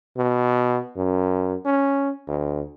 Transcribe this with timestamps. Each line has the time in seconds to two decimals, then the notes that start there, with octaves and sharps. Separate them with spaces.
0.18 B2
0.97 F#2
1.65 C#4
2.27 D2